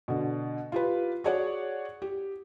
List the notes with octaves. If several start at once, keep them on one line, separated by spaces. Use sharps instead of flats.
B2 D3
F4 G4 B4
F#4 G#4 C#5 D5 F#5
G4